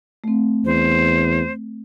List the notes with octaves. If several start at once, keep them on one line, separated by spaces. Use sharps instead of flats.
A3 C4
E2 C5